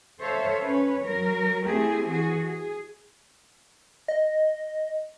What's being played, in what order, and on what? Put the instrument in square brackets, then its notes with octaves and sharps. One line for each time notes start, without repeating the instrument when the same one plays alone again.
[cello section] A4 C5 C#5 E5 F5
C#4 B4 C#5
F#3 A#4
A3 C4 E4 G4 G#4
E3 F#4 G#4
G#4
[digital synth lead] D#5